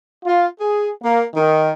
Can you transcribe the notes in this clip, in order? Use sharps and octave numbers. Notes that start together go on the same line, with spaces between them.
F4
G#4
A#3
D#3